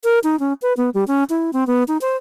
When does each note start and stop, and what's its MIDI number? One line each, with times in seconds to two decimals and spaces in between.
0.04 0.19 70
0.24 0.38 63
0.40 0.53 61
0.62 0.73 71
0.77 0.90 59
0.94 1.04 55
1.07 1.24 61
1.29 1.51 64
1.53 1.67 60
1.67 1.83 59
1.88 1.98 63
2.01 2.16 72